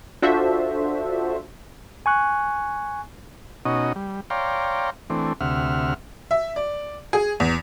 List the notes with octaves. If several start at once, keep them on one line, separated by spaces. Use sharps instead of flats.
D4 F4 F#4 A4 C5 E5
G#5 C#6 F#6
B2 C#4 D#4 F#4 D#5
G3
C#5 D5 F5 G5 A#5 C6
E3 A3 C4 D4
D2 C3 E5 F#5 F6
E5
D5
G#4
E2